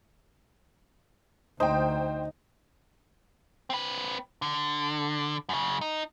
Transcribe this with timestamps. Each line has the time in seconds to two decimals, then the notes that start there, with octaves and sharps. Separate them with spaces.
1.60 D2 D#4 C5 G5
3.70 C4 B4
4.42 D3
5.49 F#2 C#3
5.81 D#4